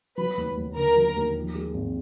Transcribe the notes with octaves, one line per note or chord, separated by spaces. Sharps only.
F#3 B4 B5
D#2
D#2
D3 A#4 A#5
F#3
D#2
F3
G#3
G#1